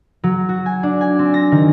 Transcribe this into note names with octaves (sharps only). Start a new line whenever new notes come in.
F#3
F#4
G#5
D4
G#5
C4
A#6
D#3